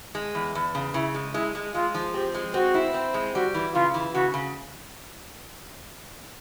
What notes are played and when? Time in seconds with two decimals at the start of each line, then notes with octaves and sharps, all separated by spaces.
0.15 G#3
0.35 E2
0.55 E2
0.75 C#3
0.94 C#3 E4
1.14 G#3
1.34 G#3 E4
1.55 G#3
1.74 G#3 F4
1.95 F3
2.14 C4 G4
2.34 G#3
2.54 C4 F#4
2.74 E4
2.94 C4
3.14 G#3
3.34 G3 F#4
3.54 E3
3.74 C#3 F4
3.94 E3
4.14 C#3 F#4
4.34 C#3